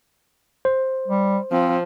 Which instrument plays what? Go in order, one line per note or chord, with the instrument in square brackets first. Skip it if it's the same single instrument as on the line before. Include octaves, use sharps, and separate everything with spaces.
[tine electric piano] C5
[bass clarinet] G3
[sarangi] F3 [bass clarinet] C4